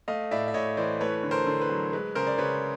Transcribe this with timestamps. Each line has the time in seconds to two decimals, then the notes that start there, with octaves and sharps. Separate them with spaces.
0.08 A3 D#5 F5
0.31 A2 D5 E5
0.48 E5
0.54 A2 C#5 D#5
0.77 E3 C5 D5
1.01 A3 B4 C#5
1.23 D3
1.31 A#4 C5
1.47 D3
1.61 B4
1.69 F#3
1.93 G#3 B4
2.15 C#3 A#4 C5
2.27 D5
2.38 C#3 B4 C#5